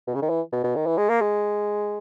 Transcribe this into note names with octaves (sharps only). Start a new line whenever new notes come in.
B2
C#3
D#3
E3
B2
B2
D#3
E3
G#3
A#3
G#3